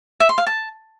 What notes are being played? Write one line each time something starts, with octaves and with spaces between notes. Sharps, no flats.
E5
C6
F5
A5